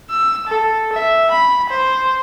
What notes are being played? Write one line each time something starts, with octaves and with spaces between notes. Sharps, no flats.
E6
A4
E5
B5
C5